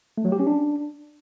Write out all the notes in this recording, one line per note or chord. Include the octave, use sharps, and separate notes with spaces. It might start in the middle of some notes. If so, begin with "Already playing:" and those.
A3
F#3
G4
C#4
D4